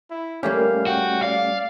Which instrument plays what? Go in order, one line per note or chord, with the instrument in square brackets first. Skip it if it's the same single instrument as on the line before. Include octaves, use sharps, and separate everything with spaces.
[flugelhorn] E4
[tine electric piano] G3 A3 C#4 [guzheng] A#3 E4 G4 [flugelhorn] F5
[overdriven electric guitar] F#4 [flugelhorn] G5
[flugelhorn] D5 [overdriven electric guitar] F5